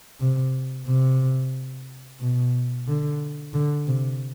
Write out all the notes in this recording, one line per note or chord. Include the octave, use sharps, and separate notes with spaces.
C3
C3
B2
D3
D3
C3